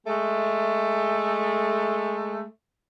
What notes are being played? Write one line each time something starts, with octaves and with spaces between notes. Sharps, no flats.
G#3 A3